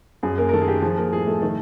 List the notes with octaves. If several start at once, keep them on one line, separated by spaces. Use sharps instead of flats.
F#2 G#4
A#3 A#4
A#4
D#3 A3 A4
G#4
G4
F3 G#4
A#3 A#4
A2 G#4
A3 A4
D#3 A3 A4